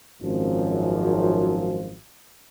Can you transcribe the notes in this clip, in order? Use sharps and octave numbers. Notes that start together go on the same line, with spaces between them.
G#1 F#2 F3